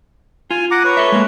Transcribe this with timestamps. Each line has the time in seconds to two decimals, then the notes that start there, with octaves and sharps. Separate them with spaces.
0.51 F4 G#5
0.71 F#5 A#5 D6
0.84 B4 C#5
0.97 A4 E5
1.12 G#3 A#3